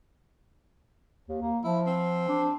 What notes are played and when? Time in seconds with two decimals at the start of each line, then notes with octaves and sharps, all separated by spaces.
1.28 D#2
1.41 A#3
1.64 F3 E4
1.87 C4
2.28 D4